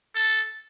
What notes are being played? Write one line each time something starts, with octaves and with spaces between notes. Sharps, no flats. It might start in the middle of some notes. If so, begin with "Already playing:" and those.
A4